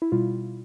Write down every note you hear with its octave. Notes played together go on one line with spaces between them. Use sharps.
E4
B2 G3 F4